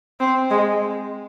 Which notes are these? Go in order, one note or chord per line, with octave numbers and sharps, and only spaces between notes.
C4
G#3